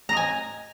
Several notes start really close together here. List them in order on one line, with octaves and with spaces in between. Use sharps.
A#5 D#5 G#5